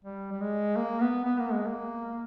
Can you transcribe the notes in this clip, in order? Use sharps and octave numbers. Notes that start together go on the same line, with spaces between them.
G3
G3
G#3
A#3
B3
B3
A#3
G#3
A#3